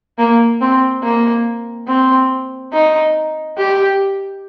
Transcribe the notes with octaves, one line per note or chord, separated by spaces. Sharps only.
A#3
C4
A#3
C4
D#4
G4